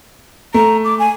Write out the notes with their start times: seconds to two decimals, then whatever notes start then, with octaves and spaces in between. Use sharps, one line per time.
0.54 A3 A#5
0.85 D6
0.99 G#5